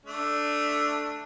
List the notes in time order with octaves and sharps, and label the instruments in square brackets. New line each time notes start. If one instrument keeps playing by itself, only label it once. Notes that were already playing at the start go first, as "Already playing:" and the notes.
[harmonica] A3 D4